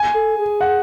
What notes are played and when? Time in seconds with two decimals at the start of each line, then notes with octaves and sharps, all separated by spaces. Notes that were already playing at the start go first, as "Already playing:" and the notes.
Already playing: G#5
0.14 A4
0.38 G#4
0.61 F#5